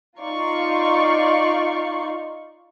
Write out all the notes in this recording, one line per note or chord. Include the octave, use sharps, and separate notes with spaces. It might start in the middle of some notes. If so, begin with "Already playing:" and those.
D#4 F4 D5 F5 C6 C#6